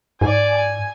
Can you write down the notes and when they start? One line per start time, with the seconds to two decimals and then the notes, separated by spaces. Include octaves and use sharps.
0.21 G#2 D5 G#5
0.55 G#5